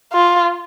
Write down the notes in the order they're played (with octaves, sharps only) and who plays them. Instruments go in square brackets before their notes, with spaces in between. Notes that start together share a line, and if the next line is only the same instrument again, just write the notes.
[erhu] F4